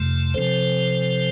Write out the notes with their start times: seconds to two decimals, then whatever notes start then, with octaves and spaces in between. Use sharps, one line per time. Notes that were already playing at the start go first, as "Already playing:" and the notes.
Already playing: F2 C3 A3
0.34 C3 F3 C4 A4 C5